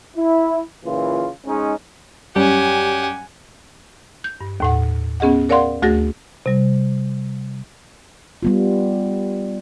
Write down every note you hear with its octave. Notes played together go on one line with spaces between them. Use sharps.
E4
A#2 C#3 E3 F4
G#2 G#3 C#4 D#4
F#2 G3 C#4 G4 F#5 G#5
G6
G2
D#2 A2 F#5
B3 C#4 G#4 D#5 F#5
A#4 C#5 D5 F5 F#5 C6
D2 A3 F#4 G#4 A6 A#6
C3 G3
G3 B3 F4